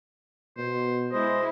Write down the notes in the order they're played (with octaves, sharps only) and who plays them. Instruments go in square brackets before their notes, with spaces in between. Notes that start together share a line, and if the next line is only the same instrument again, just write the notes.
[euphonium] B2 [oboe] C5
[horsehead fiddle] G#3 E4 [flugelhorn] C5 [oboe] D#5